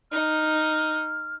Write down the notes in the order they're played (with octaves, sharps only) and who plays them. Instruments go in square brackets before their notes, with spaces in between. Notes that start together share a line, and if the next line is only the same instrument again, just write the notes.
[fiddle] D#4 [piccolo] F6